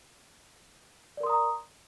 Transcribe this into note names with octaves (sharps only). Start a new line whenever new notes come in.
A#4 D5 A#5 C6 D#6